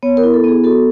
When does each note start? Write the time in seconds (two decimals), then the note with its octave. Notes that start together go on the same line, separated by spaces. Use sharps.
0.03 B3 C#5
0.17 A#4
0.24 E4
0.34 A4
0.44 B3 G#4
0.64 F#4 A4